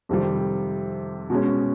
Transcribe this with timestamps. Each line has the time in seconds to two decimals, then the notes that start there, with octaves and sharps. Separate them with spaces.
0.09 F2 C3 D#3 G3
1.30 B2 G#3 C#4